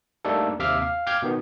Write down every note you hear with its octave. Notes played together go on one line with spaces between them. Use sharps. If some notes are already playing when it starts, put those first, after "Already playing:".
G3 A3 A#3 D4 D#4 A4
D#2 C3 E5 F5 D6 F6
F5
F5 G5 D6 F6 G6 G#6
B2 D#3 B3